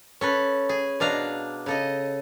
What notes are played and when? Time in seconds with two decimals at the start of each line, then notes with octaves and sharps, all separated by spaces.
0.21 C#4 A4 B4
0.69 G#4
1.00 B2 D4 F5 A#5
1.66 C#3 A4 D#5